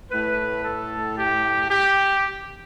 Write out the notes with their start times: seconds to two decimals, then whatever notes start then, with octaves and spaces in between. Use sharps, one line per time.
0.11 A2 A3 B4
0.65 A4
1.17 G4
1.70 G4